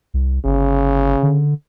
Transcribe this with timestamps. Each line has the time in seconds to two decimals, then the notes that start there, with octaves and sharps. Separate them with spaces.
0.14 C2
0.45 G1 C#3
1.23 D3